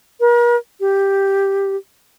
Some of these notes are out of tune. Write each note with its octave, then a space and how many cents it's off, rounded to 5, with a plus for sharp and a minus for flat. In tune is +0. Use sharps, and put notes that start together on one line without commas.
A#4 +45
G4 +0